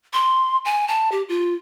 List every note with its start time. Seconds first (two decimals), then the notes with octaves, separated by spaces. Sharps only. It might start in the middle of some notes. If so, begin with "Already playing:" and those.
0.13 C6
0.65 G#5
0.88 A5
1.12 G4
1.29 F4